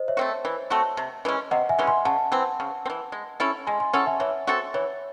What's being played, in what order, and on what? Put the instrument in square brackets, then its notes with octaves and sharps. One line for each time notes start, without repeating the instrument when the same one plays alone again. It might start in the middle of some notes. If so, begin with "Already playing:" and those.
Already playing: [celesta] C5 D#5
C#5 E5
[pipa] A3 C4 F#4
E3
A3 C4 F#4
C3
E3 G#3 C#4
[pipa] C3 [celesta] D#5 F#5
[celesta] E5 G#5
[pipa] E3 G#3 C#4
[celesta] G#5 C6
[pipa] C#3 [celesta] F#5 A5
[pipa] E3 C4
C#3
C4
E3
G#3
C#4 E4 A4
[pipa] G#3 [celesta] G#5 C6
[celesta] G#5 C6
[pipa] C#4 E4 A4 [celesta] F#5 A5
[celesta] E5 G#5
[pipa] E3 [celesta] C#5 E5
[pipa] C4 F#4 A4
[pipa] E3 [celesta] C#5